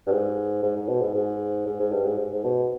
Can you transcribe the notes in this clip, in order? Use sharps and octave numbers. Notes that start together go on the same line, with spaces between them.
G2
G#2
G#2
G#2
B2
G#2
G#2
G#2
G#2
G2
G#2
G#2
G#2
B2